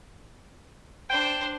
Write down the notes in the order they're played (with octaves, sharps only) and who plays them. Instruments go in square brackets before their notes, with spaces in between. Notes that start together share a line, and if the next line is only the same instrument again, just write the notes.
[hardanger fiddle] D4 C5 [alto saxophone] G5